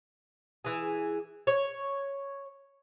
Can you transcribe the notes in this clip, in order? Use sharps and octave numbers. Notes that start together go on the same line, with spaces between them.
E3 G#4
C#5